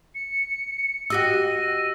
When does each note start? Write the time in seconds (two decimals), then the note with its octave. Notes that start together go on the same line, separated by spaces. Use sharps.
0.14 C#7
1.10 F#4 G4 D#5 E6 A#6 D#7